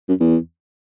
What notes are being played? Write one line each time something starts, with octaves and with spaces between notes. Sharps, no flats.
F#2
E2